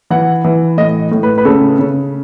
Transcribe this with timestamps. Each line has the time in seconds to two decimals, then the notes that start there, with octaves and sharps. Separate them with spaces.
0.10 E3 F#5
0.44 E3
0.78 A2 D#5
1.12 A2
1.23 B4
1.38 B4
1.45 C#3 A4
1.79 C#3